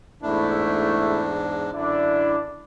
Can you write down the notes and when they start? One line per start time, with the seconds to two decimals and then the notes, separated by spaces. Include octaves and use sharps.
0.22 E2 G#2 A3 D4 E4
1.73 F#2 D3 D4 E4